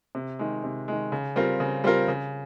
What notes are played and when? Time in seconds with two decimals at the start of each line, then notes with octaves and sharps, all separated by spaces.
0.15 C3
0.39 D#3 G#3
0.64 C3
0.88 D#3 G#3
1.12 C#3
1.36 G3 C4 F4 A#4
1.60 C#3
1.84 G3 C4 F4 A#4
2.08 C#3